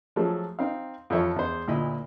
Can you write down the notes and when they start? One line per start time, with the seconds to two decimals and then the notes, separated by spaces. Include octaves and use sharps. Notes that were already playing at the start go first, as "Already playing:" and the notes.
0.16 F3 F#3 A3 G#4 A4
0.59 C4 D#4 F5
1.10 F2 E3 F3 A4 C#5 E5
1.36 E2 C5
1.68 D2 A#2 E4 D#5 B5